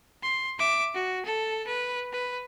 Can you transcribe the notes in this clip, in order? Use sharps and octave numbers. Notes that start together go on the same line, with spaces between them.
C6
E5 D6
F#4
A4
B4
B4